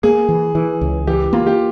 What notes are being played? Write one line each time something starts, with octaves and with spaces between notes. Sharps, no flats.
A#3 G#4
E3
E3
C#2
E3 G4
A#3 F4
G4